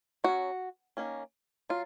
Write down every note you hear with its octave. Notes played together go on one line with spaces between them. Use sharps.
F#3 C#4 F#4
D#3 A#3 C#4
F#3 F4